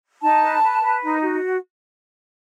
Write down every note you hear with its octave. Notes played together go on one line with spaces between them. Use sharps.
D#4 A5
B4
B4
B4
D#4
F#4